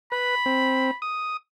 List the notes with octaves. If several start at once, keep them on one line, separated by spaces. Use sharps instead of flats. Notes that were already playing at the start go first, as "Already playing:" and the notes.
B4 B5
C4
D#6